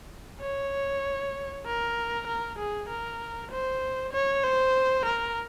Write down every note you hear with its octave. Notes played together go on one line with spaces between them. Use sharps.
C#5
A#4
A#4
G#4
A#4
C5
C#5
C5
A#4